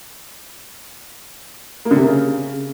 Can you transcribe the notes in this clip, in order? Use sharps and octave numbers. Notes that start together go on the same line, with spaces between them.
A#3
D3
C3
A#3
C#3